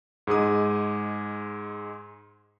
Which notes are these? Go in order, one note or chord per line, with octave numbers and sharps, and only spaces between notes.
G#2 G#3 G#4 D#6